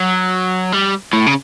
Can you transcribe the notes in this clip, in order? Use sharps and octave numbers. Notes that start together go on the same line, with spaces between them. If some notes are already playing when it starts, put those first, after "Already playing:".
Already playing: F#3
G3
A2
C#3